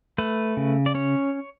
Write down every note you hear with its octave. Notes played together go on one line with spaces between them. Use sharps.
A3 B4
C#3
D5
C#4 C#5